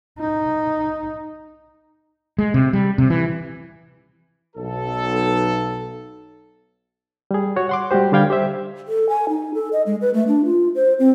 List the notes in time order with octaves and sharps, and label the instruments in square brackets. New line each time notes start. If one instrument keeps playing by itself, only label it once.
[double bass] D#4
[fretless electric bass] G#3
C3
G3
C3
E3
[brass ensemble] B1 A4
[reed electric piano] G3 G#4
F#4 C#5
F#5 C6 D6
G3 G#3 F#4 G4 C5
D3 G3 F5 G5 G#6
G4 C5 E5
[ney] A4
G#5
D#4
A4
D#5
G#3
B4
A3
D4
F4
C5
C4